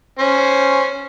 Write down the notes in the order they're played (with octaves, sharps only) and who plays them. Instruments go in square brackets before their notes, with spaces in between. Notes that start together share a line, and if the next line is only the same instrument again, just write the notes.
[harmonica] C#4 C5